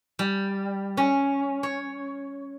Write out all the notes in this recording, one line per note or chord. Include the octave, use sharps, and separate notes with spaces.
G3
C#4
C#5